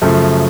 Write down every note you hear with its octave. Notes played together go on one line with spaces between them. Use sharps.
F#2 C#3 F3 A3